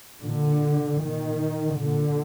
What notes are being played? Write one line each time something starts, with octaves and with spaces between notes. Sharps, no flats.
A#2 D3
A#2 D#3
A#2 D3